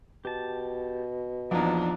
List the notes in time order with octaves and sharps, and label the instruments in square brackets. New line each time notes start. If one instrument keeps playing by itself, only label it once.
[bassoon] B2 [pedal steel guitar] G4 A5
[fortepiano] A#1 E2 [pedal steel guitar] F3 [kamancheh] D4 D#4